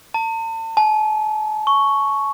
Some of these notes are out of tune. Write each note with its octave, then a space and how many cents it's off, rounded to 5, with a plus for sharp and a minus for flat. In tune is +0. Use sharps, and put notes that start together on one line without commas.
A5 +40
A5 -45
C#6 +0